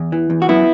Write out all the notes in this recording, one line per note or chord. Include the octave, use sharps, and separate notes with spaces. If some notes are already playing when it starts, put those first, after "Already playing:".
Already playing: E2
E3
E2
F#4
F#2 B3 E4